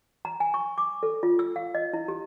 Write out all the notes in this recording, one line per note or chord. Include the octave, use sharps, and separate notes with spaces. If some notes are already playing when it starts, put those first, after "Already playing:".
A#5
G#5
C#6
D6
A4
F4
E6
F5
D#5
E4
G4